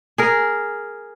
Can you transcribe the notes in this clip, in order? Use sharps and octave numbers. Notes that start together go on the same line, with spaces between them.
G#4 A#4